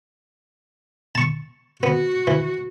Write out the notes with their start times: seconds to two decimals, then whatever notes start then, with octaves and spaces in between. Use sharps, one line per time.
1.15 A5 C#6
1.83 B3 F#4
2.27 E3